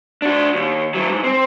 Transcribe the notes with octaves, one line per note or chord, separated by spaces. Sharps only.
D4 F#4
D#2
F#3 E4
G#2
C4